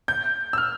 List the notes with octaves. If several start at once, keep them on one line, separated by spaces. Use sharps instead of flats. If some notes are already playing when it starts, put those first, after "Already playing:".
G6
E6
F6